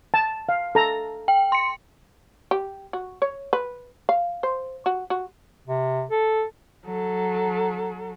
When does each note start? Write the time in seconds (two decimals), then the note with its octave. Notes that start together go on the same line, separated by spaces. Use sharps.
0.14 A5
0.49 F5
0.75 A4 A#5
1.28 G5
1.52 C6 C#7
2.51 G4
2.93 F#4
3.22 C#5
3.53 B4
4.09 F5
4.43 C5
4.86 F#4
5.10 F#4
5.68 C3
6.10 A4
6.86 F#3 A4